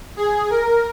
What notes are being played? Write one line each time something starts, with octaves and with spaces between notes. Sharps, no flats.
G#4
A#4